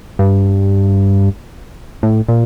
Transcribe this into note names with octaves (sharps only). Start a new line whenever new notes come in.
G2
A2
A#2